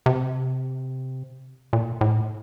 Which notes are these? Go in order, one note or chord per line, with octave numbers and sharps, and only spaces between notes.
C3
A#2
A2